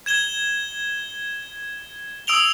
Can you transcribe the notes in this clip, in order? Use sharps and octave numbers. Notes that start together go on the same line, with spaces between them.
G#6 E7 G7
D#6 E6 D7 F7 G7